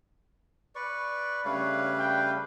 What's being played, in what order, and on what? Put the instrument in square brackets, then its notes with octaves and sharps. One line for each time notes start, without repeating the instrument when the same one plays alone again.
[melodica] B4 D5 C#6
[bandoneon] C#3 G3 A3 [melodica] D4 B4 F5 [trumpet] C#5
[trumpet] G5